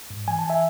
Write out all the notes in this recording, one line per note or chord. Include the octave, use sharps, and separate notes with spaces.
G#2
E3 G#5
A5
E3 E5 G#5